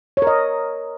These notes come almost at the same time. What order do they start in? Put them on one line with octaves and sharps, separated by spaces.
C#5 A#4 D#5